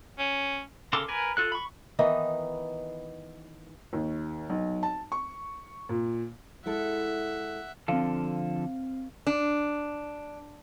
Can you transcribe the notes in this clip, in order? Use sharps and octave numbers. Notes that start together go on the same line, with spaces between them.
C#4
C#3 A4 A#4 C6 D6
A#4 B4 G#5
F4 A4 F#6
B5 C#6
D#3 E3 B3 D#4
D#2
B1
A5
C#6
A#2
G#3 E4 A4 E5 F#5
D3 F3 C4 A4 F5
D4